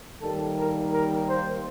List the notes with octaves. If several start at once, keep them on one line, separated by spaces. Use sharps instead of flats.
D#2 D#3 G3 A#3 A4
A#4
A#4
C5